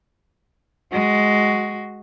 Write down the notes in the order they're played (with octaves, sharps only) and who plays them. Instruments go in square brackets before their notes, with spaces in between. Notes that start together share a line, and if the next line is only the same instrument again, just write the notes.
[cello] G#3 F#4